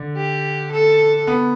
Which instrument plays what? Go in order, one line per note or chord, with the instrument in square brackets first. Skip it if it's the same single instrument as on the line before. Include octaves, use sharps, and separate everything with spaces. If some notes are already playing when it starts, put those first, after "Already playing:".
Already playing: [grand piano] D3
[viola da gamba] G4
A4
[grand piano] B3